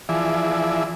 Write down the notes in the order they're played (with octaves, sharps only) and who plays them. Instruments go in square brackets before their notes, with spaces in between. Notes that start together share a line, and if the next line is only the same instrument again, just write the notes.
[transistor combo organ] E3 F3 G#4 D5 E5